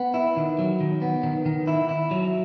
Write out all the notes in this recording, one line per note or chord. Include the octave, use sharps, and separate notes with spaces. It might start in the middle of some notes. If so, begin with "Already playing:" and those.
Already playing: B3
E4
D#3
F#3
D#3
B3
D#3
D#3
E4
E4
F#3